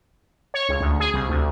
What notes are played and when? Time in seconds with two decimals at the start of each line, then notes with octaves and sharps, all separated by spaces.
0.54 C#5
0.69 C#2
0.81 D2
1.00 G#4
1.14 C2
1.29 D2